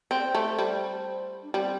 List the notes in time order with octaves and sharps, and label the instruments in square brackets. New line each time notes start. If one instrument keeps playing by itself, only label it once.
[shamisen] C4 [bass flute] C5
[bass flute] D5
C5
[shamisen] A3
G3
[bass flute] D4
[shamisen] G3 [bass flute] C4